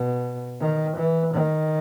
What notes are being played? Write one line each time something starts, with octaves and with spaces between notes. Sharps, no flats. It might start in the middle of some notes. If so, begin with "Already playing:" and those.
Already playing: B2
D#3
E3
D#3